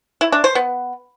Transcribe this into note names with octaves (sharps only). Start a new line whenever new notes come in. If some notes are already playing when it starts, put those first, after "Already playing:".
E4
D4
C5
B3